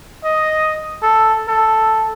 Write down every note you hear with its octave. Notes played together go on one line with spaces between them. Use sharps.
D#5
A4
A4